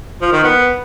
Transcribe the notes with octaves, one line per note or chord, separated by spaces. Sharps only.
F3
D#3
B3